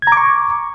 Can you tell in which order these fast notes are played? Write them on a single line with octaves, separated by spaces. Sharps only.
G#6 A#5 D6 C#6